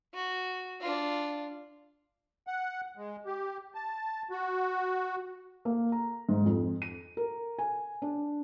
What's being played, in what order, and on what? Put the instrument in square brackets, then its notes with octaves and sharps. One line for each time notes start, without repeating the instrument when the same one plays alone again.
[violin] F#4
D4 F4
[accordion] F#5
G#3
G4
A5
F#4
[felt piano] A#3
A#5
G#2
F2
D#7
A#4
G#5
D4